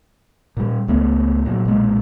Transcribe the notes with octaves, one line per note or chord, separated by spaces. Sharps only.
A#2 G3
C#2 A3 B3
A#2 F3 F#3
B1 A#2 G#3 A#3